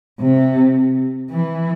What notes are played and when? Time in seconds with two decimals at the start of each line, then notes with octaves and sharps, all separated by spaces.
0.21 C3
1.31 E3